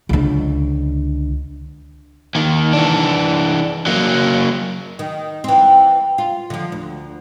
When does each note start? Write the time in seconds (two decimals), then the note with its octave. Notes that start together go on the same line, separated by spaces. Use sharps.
0.09 C#2 D3
2.35 D#2 D#3
2.73 E3 D4
3.87 F#3 A#3
4.99 D#3
5.44 E3 C4
6.18 F4
6.50 D3 F3
6.72 D2